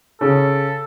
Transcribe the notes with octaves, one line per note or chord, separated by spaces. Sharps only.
C#3 A4